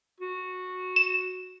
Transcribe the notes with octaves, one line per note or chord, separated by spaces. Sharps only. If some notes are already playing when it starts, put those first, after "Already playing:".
F#4
E7